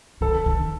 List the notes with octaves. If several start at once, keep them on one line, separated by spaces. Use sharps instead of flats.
D#3 A4
D#3